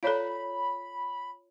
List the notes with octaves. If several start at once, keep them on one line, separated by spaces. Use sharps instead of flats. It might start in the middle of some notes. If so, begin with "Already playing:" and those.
F4 A4 C#5 D5 F5 A#5 B5